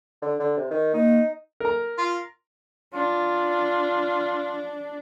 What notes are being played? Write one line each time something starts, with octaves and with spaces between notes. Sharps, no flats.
D3
D3
C3
D#3
A#3 D#4
A#4 A#5
F4
D4 F4